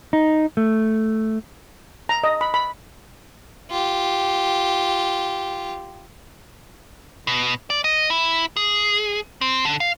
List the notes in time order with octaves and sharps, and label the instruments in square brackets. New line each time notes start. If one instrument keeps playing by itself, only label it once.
[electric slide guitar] D#4
A3
[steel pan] A#5
D#5
B5
B5
[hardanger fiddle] F4 G4
[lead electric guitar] B2
D5
D#5
E4
G#4
C4
D3
F5